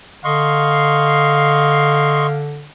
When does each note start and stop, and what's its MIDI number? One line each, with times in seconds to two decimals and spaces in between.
0.25 2.68 50
0.25 2.27 75
0.25 2.41 77
0.25 2.27 84
0.25 2.27 85